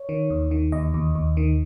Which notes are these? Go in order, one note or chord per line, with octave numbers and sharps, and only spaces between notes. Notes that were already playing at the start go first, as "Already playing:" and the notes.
Already playing: C#5
D#3
D#2
D#3
D#2 D#5
D#2
D#2
D#3